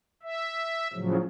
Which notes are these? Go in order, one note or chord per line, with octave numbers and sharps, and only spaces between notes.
E5
A2 C#3 F3 F#3